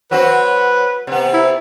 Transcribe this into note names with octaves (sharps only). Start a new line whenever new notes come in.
F#3 C4 F#4 B4
C3 B3
E4